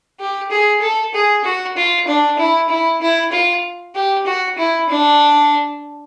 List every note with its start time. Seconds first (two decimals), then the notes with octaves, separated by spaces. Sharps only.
0.20 G4
0.51 G#4
0.82 A4
1.14 G#4
1.44 F#4
1.76 F4
2.07 D4
2.38 E4
2.69 E4
3.01 E4
3.32 F4
3.95 G4
4.26 F#4
4.58 E4
4.89 D4